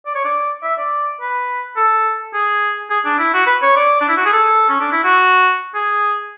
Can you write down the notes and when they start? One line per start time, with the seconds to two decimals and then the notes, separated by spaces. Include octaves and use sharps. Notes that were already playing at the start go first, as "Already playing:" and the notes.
0.06 D5
0.15 C#5
0.25 D5
0.63 E5
0.78 D5
1.21 B4
1.77 A4
2.34 G#4
2.90 G#4
3.05 D4
3.19 E4
3.34 F#4
3.47 B4
3.62 C#5
3.76 D5
4.01 D4
4.09 E4
4.17 F#4
4.25 G#4
4.33 A4
4.69 C#4
4.81 D4
4.92 E4
5.04 F#4
5.75 G#4